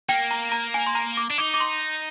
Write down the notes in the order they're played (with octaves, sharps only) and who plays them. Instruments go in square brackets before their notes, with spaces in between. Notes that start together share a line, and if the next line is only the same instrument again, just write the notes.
[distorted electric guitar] A#3 [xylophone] G5
[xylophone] A#5
A#5
G#5
C6
A#5
D6
[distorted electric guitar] D4
[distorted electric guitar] D#4 [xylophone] D6
[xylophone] D6
C6